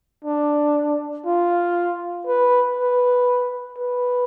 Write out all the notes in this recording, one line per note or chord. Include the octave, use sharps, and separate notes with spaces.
D4
F4
B4
B4
B4